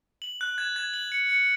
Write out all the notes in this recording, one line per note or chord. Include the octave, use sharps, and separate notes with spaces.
F#7
F#6
G#6
G#6
F#7
C#7
C#7